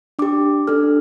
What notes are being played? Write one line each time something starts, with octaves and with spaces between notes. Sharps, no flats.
D4 G4 D6
D4 A4 F6